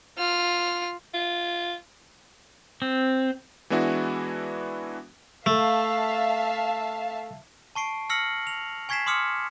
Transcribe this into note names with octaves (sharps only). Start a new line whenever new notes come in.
F4 F6
F4
C4
E3 G#3 B3 D4 E4 F#4
A3 E5 F5 A5
A5 C#6 C7 D7
E6 F6 A#6 C7 C#7 F#7
F7
G#5 C#6 G#6 B6 C7 E7
C6 D6 D#6 F6 C#7